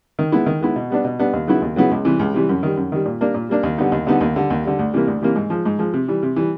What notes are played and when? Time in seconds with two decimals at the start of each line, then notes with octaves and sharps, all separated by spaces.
0.19 D#3
0.32 G#3 B3 E4
0.46 D#3
0.61 G#3 B3 E4
0.76 B2
0.90 G3 B3 D4
1.04 B2
1.19 G3 B3 D4
1.33 D#2
1.47 C#3 F#3 B3 E4
1.62 D#2
1.76 C#3 F#3 B3 E4
1.91 C#2
2.05 C3 E3 G3
2.19 C#2
2.34 C3 E3 G3
2.49 F#2
2.63 D#3 G3
2.77 F#2
2.92 D#3 G3
3.05 A#2
3.21 G3 A#3 D4
3.34 A#2
3.49 G3 A#3 D4
3.63 D#2
3.78 D3 G3 B3 D#4
3.92 D#2
4.07 D3 G3 B3 D#4
4.21 D#2
4.36 D3 G3
4.50 D#2
4.64 D3 G3
4.79 D2
4.94 C3 E3 G3 A#3
5.07 D2
5.22 C3 E3 G3 A#3
5.36 G#2
5.50 F3 G#3
5.66 G#2
5.79 F3 G#3
5.93 C3
6.08 E3 G3
6.23 C3
6.36 E3 G3